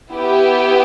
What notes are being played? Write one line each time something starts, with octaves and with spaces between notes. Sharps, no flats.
B3 E4 G4